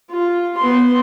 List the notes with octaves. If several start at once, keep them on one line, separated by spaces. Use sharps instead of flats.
F4
B3 C6